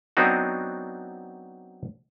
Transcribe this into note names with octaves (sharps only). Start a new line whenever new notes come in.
F#3 B3 C4 D4 D#4 F#4